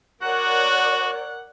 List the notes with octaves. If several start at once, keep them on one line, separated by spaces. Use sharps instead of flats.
F#4 A#4 C#5 D5 F#5